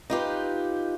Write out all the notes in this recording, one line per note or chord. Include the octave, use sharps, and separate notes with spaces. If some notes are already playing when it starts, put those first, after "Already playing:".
D#4 F4 G4 B4